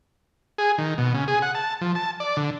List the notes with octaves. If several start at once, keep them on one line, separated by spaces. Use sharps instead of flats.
G#4
D#3
B2
C#3
G#4
F#5
A5
F3
A5
D5
D3